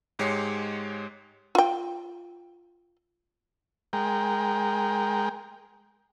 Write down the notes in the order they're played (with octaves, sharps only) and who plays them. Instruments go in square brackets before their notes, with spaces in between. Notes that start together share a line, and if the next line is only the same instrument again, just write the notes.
[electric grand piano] G#2 G#3 G4 C#5 C7 C#7
[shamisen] F4 G5
[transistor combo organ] G#3 A#4 G5